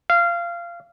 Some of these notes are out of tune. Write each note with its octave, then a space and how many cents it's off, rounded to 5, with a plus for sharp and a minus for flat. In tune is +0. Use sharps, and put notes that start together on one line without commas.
F5 -20